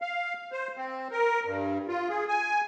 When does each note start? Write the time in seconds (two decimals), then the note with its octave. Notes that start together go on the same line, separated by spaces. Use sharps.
0.02 F5
0.52 C5
0.77 C4
1.11 A#4
1.45 G2
1.88 F4
2.09 G#4
2.28 G#5